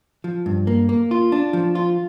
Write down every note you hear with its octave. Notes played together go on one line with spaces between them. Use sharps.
F3
G2
A#3
A#3
F4
D4
F3
F4